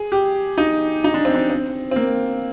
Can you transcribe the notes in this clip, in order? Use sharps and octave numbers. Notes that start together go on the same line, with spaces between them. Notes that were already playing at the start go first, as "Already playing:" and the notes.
Already playing: G#4
G4
D#4
D#4
D4
C4
D4
C4
C4
A#3